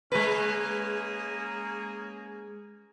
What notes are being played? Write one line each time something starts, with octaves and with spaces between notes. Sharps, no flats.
G#3 A#3 C#4 G#4 B4